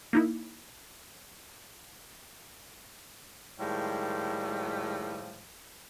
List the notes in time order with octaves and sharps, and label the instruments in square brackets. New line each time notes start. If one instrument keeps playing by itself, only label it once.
[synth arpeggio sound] A#3 D#4 E4
[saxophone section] A2 D#3 F3 G3 G#3